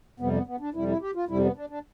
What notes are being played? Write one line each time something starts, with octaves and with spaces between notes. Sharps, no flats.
F2 C3 G3 B3
B3
B3
D4
F2 C3 G3 E4
E4
G4
F4
F2 C3 G3 E4
C4
B3
D4
D4